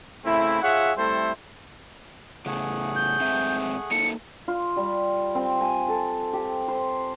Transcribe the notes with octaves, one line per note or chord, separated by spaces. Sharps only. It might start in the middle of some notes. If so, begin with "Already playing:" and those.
C#3 A3 C4 E4
F4 G#4 C#5 E5 F#5
G3 A3 C4 E4 A4 C5
A2 C#3 A3 G#4 F#5
G6
G#2 C4 E5
A#3 D#4 A4 C#7
F4
G3
C4
G#5
A4
G4
C5